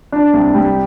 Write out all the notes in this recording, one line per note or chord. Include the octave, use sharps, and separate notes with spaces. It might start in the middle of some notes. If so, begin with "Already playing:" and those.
D4
C2
G3